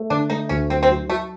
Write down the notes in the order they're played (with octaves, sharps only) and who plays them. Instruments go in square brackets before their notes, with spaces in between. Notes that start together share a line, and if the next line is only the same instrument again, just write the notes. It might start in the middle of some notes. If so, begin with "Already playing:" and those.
Already playing: [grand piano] A3
[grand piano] D3 [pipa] D4
[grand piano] A3 [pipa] D#4
[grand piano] D2 [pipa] C#4
[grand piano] F#3 [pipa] C4
[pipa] C4
[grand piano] F#3
[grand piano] F#3 [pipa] A3